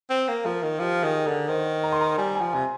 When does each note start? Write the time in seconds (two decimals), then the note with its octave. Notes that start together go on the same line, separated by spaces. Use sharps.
0.10 C4
0.28 A#3
0.45 F3 A#4
0.63 D#3
0.79 F3 G4
1.03 D#3 G#4
1.26 D3 A#4
1.48 D#3 C5
1.84 A#5
1.92 C6
2.01 A#5
2.18 G3 G#5
2.35 G#5
2.41 F3
2.53 C3 G#5